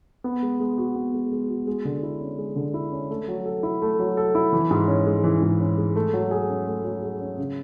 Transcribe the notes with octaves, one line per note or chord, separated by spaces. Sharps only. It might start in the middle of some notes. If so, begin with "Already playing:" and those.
B3
G#3
G#3
F#4
B3
G#3
G#3
F#4
G#3
D3
E4
C#4
G#3
D3
E4
C#4
A3
F#3
A4
E4
A3
F#3
A4
E4
E3
G#2
C#4
G#3
E3
G#2
C#4
G#3
A3
F#3
G#4
C#4
A3
F#3
G#4
C#4
C#3